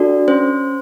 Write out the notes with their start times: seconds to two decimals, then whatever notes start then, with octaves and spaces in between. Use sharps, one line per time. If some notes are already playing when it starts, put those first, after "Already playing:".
Already playing: D4 F#4 A4 D5
0.28 C#4 C5